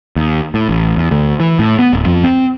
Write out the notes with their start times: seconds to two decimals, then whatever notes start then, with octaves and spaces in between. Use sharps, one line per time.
0.16 D#2
0.54 A2
0.69 A1
0.97 E2
1.11 D2
1.40 E3
1.59 A2
1.79 B3
1.93 D1
2.06 F2
2.24 C4